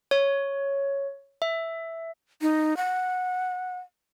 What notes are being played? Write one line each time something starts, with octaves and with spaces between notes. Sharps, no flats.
C#5
E5
D#4
F#5